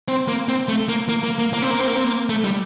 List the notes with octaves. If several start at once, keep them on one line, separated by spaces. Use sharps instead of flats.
C4
A#3
C4
A3
A#3
A#3
A#3
A#3
A#3
C4
A#3
C4
A#3
C4
A#3
A3
G3